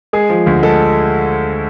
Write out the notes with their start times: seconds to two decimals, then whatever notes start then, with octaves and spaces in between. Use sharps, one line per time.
0.13 G#3 G#4
0.30 F3
0.46 D2
0.63 G#3 A4